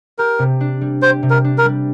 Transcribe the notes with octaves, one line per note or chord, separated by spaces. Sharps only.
G4 A#4
C3
D4
G3
G4 C5
C3
A#4
D4
A#4
G3